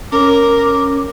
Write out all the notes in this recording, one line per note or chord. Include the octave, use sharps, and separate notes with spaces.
C#4 A#4 D6